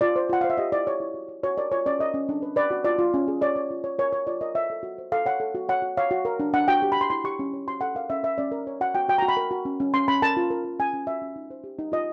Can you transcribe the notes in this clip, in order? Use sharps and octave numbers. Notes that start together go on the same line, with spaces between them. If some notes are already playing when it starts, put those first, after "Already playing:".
F4 D5
C5
F4 F#5
C5 F5
E5
G4 D#5
E4 D5
G4 C#5
E4
F#4
C#5
F#4 C#5
A#4 D5
F4 C#5
C#4 D5
A#4 D#5
C#4
D4
B4
B4 D5
F#4
F4 D5
F4
C#4
G#4
C#5 D5
C#5
F4
C#5
A#4 C#5
C#5
F4 D5
A#4 D#5
C5 E5
A4
F#4
C5
A4 F5
C#5 F#5
A4
F#4
C#5 F#5
F#4
C#5 F5
F#4
A#4
D4
D4 F#5
F#4 G5
G4
B5
G4 C6
E4 C6
G4 C#6
C#4
C#5
F#4 C6
A4 F#5
A#4 F5
C#4 E5
A#4 E5
C#4 D5
A#4
C#5
F#4 F#5
F#4 G5
F#4 G5
A#5
F#4
B5
A#4
F#4
C#4
C#4
C#4 C6
C#4 B5
A#4 A5
F4
A#4
A#4
C#4 G#5
C#4
F#4 E5
C#4
D#4
C5
G4
D#4
F4 D#5